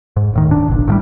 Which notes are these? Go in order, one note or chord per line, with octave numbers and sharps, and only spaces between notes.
G#2
D1 A2 D#3
D4
F#1 B1
A2 F3 G3